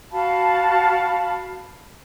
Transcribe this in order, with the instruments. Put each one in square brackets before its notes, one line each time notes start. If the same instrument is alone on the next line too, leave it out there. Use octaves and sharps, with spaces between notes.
[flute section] F#4 F5 A5 B5